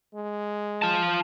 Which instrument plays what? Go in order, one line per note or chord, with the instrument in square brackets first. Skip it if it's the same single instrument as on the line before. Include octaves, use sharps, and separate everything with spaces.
[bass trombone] G#3
[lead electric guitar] F4 A5